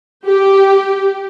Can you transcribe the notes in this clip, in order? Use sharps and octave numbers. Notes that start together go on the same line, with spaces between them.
G4